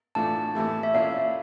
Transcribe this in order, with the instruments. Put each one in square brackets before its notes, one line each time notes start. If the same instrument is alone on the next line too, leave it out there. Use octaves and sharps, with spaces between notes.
[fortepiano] A2 E3 A3 D4 F4 [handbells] A5
[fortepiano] A2 E3 A3 E4 G4
[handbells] E5
[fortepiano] A#2 A3 C#4 E4 [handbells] F5